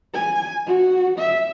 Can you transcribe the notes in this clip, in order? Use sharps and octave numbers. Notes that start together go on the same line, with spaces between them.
G#5
F#4
E5